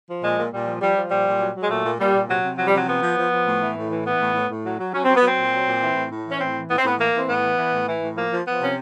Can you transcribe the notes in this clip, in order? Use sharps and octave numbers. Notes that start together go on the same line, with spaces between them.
F3
A#2 G#3
A#2
A#2 G3
F3
F3 G3
F3
A#2 G3
A#2
F#3
F#3
G#3
A#2 A3
A#2
A#2 G3
A#2
C3 F#3
C3
F3 F#3
G3
C3 F#3
F3 B3
F3
F3
F3
A2
E3
A2
E3
E3 B3
A2
A2
A2
F#3
F#3
F#3 C#4
F#3 C4
B3
F#3 C4
A#2
F#3
A#2
E3
A2
A2
E3
C#4
A2 C4
E3
A2 B3
C4
A2 B3
E3 A#3
E3 C4
A2 B3
E3
E3
A2
E3
A2
F3 A#3
F3
F3 B3
C3 C#4